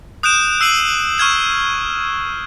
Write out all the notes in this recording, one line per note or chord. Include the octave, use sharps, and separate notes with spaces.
D#6 F#6 G6 D7 E7
E6 C7 D#7 F#7
C#6 F6 G#6 E7